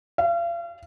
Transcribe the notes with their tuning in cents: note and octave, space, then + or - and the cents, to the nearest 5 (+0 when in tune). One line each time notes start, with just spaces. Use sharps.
F5 -40